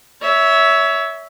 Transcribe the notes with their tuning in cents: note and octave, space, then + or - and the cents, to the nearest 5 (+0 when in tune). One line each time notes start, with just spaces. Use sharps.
C#5 +20 E5 -10